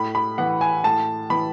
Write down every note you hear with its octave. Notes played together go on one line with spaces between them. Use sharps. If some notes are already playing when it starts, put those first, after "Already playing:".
Already playing: A2 B5
B5
E3 F#5
G#5
A2 A5
E3 B5